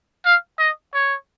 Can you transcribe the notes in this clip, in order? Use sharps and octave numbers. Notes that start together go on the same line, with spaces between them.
F5
D#5
C#5